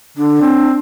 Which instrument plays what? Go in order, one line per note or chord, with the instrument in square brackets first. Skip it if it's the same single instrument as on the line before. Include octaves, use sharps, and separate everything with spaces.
[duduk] D3 [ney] D4
[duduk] C4